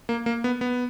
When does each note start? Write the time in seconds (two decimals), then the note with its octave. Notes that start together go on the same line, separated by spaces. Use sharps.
0.09 A#3
0.26 A#3
0.44 B3
0.61 B3